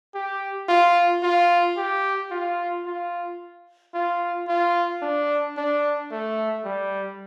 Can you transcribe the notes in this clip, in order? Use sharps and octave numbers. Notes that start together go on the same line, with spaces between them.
G4
F4
F4
G4
F4
F4
F4
F4
D4
D4
A3
G3